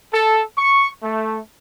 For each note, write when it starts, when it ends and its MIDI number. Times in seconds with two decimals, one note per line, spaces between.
0.13 0.43 69
0.58 0.89 85
1.03 1.39 57